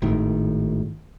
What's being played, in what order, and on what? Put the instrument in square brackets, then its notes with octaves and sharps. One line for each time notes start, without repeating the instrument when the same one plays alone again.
[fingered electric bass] G#1 A2 D#3